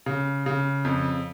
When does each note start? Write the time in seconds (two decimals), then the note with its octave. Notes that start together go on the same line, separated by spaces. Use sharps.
0.06 C#3
0.46 C#3
0.85 F2